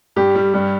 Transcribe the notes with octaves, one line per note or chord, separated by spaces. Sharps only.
G2 G4
G3
G2